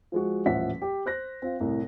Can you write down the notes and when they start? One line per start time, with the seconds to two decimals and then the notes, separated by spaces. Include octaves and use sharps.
0.12 F3 G#3 F#4
0.46 D#1 A1 F3 E5 F#5 B6
0.82 G4
1.06 C5 F#6 A#6
1.42 C4 F4
1.60 C2 A2